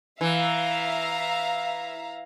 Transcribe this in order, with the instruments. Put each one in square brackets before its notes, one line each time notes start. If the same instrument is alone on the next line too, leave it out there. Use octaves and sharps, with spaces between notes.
[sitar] E3 [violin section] E5 F5 A#5